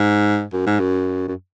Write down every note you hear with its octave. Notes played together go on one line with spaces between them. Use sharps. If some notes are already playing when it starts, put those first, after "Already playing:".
Already playing: G#2
F#2
G#2
F#2
F#2